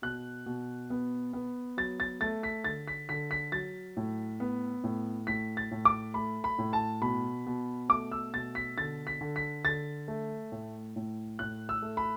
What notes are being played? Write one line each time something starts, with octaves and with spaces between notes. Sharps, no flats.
B2 F#6
B2
B3
B3
F#3 A6
A6
A3 A6
B6
D3 A6
B6
D3 B6
B6
F#3 A6
A2
B3
A2
A2 B6
A6
A2
D6
A3 B5
B5
A2
A5
B2 B5
B2
A3 D6
E6
B2 A6
B6
D3 A6
B6
D3
B6
D3 A6
A3
A2
A2
A2 F#6
E6
A3
B5